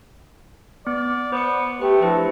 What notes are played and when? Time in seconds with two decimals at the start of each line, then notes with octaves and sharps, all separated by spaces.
0.87 B3 D5
1.32 B3 C5 C#7
1.82 A3 G4 B4
2.02 F3 D4 E4 B4